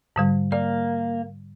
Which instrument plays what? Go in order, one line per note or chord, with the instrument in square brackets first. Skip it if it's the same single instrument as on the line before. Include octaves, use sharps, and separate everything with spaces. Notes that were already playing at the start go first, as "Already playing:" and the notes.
[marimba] G#2 D3 G3
[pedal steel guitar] A#3 [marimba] D5